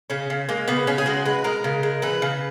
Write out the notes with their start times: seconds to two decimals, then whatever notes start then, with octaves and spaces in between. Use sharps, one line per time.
0.10 C#3 C#4
0.30 C#3
0.49 G#3 A#3
0.68 C#3 B3
0.87 C#3 C#4
0.98 G#4
1.06 G#3 F#4
1.25 G#3 B4
1.44 G#3 A#4
1.64 C#3
1.83 G#3
2.02 E3 B4
2.22 C#3